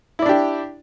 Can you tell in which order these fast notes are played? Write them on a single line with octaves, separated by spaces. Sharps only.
E4 D5 D4 G4